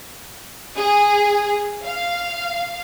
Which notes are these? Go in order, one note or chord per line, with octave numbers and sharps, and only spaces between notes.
G#4
F5